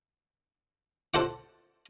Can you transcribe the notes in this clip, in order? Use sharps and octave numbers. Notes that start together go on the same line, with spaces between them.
A4 C5 F#5 D6